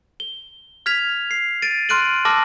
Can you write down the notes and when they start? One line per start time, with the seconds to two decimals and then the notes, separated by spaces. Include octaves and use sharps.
0.20 G7
0.86 F6 G#6 B6 F7
1.31 C7
1.62 A6 D7 D#7
1.89 C6 F6 F#6 D7 D#7 F#7
2.25 A5 D6 E6 F6 A#6 F#7